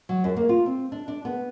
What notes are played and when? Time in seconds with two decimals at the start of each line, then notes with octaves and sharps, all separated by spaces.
0.09 F#3
0.24 F#2
0.36 A#3
0.49 F4
0.66 C4
0.92 D4
1.08 D4
1.25 B3